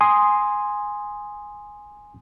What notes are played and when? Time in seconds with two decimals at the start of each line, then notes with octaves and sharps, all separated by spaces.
0.01 G#5 C6 D#6